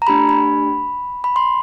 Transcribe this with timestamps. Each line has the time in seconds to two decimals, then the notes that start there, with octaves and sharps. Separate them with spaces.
0.02 A#5
0.07 A3 D4 G4 B5
0.29 B5
1.24 B5
1.36 C6